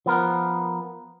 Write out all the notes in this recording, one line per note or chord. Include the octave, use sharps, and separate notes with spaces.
F3 B3 A#4